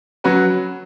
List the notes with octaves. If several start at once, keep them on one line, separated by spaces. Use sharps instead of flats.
F#3 C#4 F#4 B4